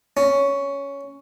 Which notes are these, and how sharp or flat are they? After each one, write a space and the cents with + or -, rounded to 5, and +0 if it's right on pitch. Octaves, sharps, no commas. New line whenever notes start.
C#4 +10